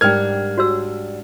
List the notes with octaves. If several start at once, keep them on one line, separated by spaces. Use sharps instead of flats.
G#2 G3 D4 A#4 G5 F6 G#6
F#4 C#5 E6